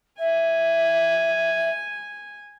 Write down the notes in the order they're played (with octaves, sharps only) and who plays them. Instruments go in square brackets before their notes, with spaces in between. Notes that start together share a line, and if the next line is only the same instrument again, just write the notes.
[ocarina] E5 [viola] G#5